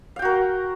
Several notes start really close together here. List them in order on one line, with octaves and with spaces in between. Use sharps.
F5 G5 F#4 A#4